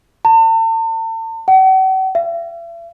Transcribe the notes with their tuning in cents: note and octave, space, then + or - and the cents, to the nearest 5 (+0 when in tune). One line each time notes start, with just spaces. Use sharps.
A5 +40
F#5 +45
E5 +45